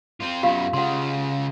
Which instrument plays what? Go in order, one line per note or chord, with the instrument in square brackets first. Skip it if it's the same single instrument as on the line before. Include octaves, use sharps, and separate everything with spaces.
[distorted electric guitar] C4 F4
[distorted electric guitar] F#2 B3 [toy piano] F4 G4 F5
[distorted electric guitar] C#3 F4 [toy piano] F#5 C6